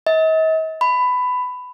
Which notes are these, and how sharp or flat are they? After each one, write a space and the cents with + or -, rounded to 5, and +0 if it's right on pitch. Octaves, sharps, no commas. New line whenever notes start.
D#5 +45
B5 +15